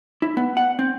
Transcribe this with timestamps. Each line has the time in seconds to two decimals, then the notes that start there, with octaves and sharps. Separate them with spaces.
0.22 E4
0.37 B3
0.57 F#5
0.79 C4